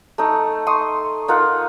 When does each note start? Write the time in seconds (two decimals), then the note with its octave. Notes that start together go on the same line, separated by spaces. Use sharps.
0.18 A3 D#4
0.67 C6 C#6 D#6
1.28 D#4 F4 A#4 F#5